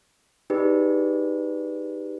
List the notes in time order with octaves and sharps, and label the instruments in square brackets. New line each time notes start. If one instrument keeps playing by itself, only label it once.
[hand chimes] D#4 G4 G#4 B4 D5